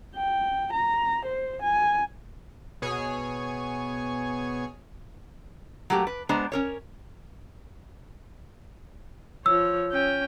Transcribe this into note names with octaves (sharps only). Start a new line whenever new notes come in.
G5
A#5
C5
G#5
B2 G#4 C#5 G#5
F#3 A3 A#3 G4
B4
G#3 B3 D4 C5 A#5
C#4 A#4 C#5
F3 C#5 E6
C#4 G5